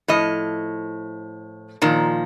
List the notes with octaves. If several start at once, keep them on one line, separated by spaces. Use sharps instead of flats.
A2 F3 D#5
A#2 D#3 F3